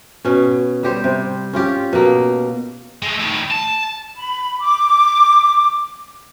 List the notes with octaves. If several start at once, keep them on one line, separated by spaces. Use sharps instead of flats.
B2 C#4
G3 G4 C5
C3
C#4 F4 G4
B2 A#3
G#3 A3
A2 D#3
A5
B5
D6